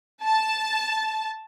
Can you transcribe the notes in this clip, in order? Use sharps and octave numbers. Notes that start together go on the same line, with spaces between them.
A5